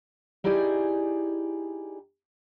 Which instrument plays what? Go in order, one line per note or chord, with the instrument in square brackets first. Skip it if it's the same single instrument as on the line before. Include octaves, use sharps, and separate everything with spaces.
[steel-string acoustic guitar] D#4 E4 G4 G#4 D5 G#5